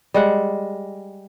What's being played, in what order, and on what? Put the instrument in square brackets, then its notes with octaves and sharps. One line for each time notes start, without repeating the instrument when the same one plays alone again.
[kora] G3 G#3 F#5